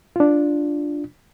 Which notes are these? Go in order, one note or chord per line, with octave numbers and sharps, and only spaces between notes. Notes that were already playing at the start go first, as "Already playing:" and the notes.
D4 F4